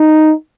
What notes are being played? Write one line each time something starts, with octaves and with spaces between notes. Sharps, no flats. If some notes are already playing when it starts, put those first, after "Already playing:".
Already playing: D#4